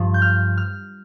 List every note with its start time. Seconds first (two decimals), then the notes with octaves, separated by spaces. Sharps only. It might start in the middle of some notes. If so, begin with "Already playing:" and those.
Already playing: G2 F3
0.14 G6
0.22 F6
0.57 F6